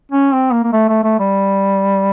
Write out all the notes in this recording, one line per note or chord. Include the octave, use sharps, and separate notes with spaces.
C#4
C4
A#3
A#3
A3
A3
A3
G3